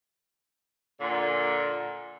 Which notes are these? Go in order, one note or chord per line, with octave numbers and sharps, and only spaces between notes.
A#2 D3